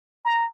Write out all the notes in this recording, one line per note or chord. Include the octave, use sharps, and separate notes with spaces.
A#5